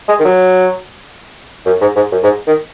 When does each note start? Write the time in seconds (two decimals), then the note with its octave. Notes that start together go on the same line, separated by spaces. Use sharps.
0.08 G#3
0.19 D#3
0.25 F#3
1.66 F#2
1.81 G#2
1.96 G#2
2.12 F#2
2.23 G#2
2.47 D#3